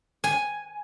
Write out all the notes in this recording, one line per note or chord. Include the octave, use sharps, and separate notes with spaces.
G#5